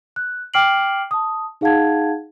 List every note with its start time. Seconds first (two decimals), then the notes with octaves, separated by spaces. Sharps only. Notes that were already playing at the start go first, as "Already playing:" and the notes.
0.16 F#6
0.54 G5 D6 F6 C7 D7 F#7
1.11 A5 D#6
1.61 D#4 G#4 F5 F#5 A5 G#6